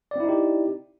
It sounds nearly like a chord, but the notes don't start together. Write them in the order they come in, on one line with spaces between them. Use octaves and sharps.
D5 C4 E4 D#4 G4